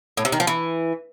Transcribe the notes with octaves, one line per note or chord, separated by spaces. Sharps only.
A2
C3
D#3
F3
E3